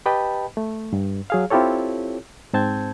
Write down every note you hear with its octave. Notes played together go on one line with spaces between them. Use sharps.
G4 B4 D#5 G5 A5 B5
A3
G2
F#3 G#4 F5
C4 E4 F4 G4 A4 C#5
G#2 C4 A5 G6 G#6